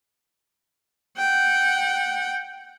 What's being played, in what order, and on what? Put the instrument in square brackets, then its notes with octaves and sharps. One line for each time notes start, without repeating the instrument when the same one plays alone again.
[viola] F#5 G5